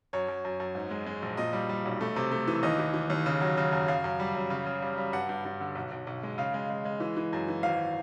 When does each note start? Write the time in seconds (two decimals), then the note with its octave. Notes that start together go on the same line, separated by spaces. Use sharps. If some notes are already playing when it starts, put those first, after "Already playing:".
0.13 F#2 C#5
0.28 F#2
0.45 F#2
0.60 F#2
0.75 G#2
0.91 G#3
1.06 G#3
1.22 A#1
1.37 A#2 D#5
1.53 G3
1.69 G3
1.85 B1
2.01 A3
2.16 C3
2.32 A3
2.48 E3
2.63 D#2 D#5
2.79 E3
2.94 E3
3.10 D#2
3.26 C#3
3.41 F#3
3.57 C#3
3.72 F#2
3.88 F#2 F5
4.04 F#2
4.20 G3
4.35 F#2
4.50 C#3
4.66 C#3
4.82 G3
4.97 G3
5.13 G2 F#5
5.29 G2
5.45 G2
5.60 D3
5.75 B1
5.91 B1
6.07 B1
6.23 G#3
6.38 C#3 F5
6.54 G#3
6.70 G#3
6.85 G#3
7.00 E3
7.17 E3
7.33 F#2
7.48 E3
7.63 G#1 F5